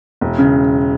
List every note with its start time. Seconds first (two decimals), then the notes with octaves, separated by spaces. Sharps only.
0.21 E1
0.38 C#3